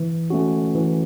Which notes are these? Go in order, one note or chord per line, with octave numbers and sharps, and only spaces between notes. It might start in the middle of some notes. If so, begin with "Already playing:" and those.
Already playing: E3
A3 C#4 F#4
E3